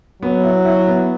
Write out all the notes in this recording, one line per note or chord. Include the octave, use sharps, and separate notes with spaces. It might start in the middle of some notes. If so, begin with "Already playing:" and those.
F#3 B3
E4
E4
B3